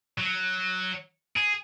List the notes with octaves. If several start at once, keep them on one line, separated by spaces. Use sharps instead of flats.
F#3
G#4